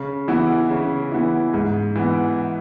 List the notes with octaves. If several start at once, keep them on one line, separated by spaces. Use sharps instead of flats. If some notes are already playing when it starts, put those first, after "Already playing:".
Already playing: C#3
E3 B3 E4
C#3
E3 B3 E4
G#2
E3 B3